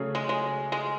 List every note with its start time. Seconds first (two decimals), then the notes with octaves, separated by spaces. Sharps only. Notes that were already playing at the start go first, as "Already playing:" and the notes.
Already playing: C#3 F#3 A3 C#4 G#4
0.15 G#3
0.29 G#3
0.72 G#3